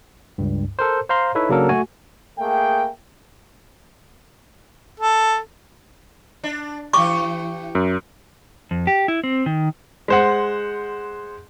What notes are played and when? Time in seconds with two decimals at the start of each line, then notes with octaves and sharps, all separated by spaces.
0.38 C#2 G2
0.79 A4 A#4 C5
1.09 C5 F5 A#5 C6
1.35 D#4 E4 A4 B4 C#5 E5
1.49 C#3 F#3 A#3 D4 A4 A#4
1.69 A3 F#4 G#5
2.39 A3 A#3 G#4 G5
5.00 A4
6.44 D4
6.93 E3 G4 C#6 D6
7.75 F#2
8.71 F2
8.87 G4
9.08 E4
9.24 C4
9.46 D#3
10.08 G#3 C5 F#5